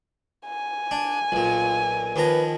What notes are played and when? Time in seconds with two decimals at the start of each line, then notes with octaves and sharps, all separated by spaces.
0.47 G#5
0.91 D4
1.32 B1 A#2 F4
2.16 D#2 F3 B4 A#5